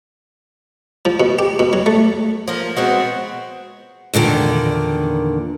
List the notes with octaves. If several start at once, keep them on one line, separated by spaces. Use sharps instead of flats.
F3
B2
G4
B2
F#3
A3
F3 A#3
G#3 B3 C4 F#4
E2 A#2 D3 D#3